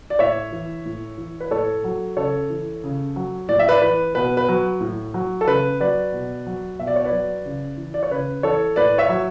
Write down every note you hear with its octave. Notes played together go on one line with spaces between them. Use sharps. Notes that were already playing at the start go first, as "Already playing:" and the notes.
D5
A2 C#5 E5
E3
A2
E3
B4
A2 A4 C#5
F#3
C#3 A4 C#5
E3
C#3
F#3
A2 D5
E5
B4 D5
E3 B4
B2 B4
B4
F#3
A2
F#3
A4
C#3 B4
F#3 B4 D5
B2
F#3
B2 E5
D5
C#5
B4 D5
F#3
C#3
E3
D5
C#5
C#3 B4
E3 A4 C#5
A2 B4 D5
C#5 E5
F#3